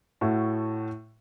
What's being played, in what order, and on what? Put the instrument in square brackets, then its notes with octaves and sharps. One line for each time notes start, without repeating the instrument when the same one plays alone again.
[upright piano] A2 A3 F#4